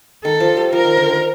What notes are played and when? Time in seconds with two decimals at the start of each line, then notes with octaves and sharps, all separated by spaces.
0.24 D#3 A4
0.40 F3
0.57 G3
0.72 F3 A#4
0.85 D#3
0.97 D3
1.04 F3
1.09 D#3